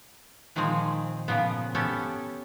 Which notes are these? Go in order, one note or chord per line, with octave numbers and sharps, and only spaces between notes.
A#2 D#3 F3 G#3 C4
A#2 C#3 F3 B3
B3 C#4 G4 A4